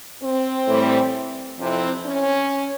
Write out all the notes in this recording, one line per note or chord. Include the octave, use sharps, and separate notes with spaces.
C4
A2 E3 G3
F2 C3 E3 C4
C#4